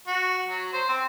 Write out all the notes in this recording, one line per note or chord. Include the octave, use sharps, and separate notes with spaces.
F#4
F#3
C5
C4